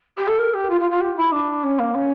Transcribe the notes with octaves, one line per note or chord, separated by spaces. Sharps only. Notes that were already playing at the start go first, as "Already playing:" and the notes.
G4
A4
A#4
G4
F4
F4
F4
G4
E4
D4
C#4
A#3
C#4